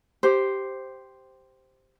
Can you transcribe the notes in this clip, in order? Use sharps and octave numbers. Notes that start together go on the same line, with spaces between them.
G4 C5